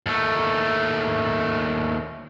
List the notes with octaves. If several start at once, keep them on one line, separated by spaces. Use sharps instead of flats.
D#2 A3